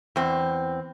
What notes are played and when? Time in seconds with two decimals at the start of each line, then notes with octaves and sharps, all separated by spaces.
0.16 E2 C4